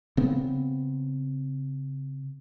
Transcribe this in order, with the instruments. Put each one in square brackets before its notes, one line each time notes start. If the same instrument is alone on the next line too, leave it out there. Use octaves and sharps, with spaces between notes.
[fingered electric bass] C#3 B3 C4